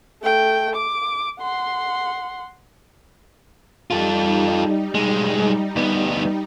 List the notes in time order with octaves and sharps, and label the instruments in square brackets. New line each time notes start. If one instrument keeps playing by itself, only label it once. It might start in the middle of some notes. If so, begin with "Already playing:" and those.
[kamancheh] A3 G5
D6
F#5 C6
[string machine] G3 D#4 [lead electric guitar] F4 A4
[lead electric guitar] B1 G#3
D2 B3